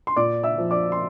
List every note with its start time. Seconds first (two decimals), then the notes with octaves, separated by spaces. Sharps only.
0.07 C6
0.16 A#2 D5 D6
0.43 E5 E6
0.58 F3
0.71 D5 D6
0.92 C6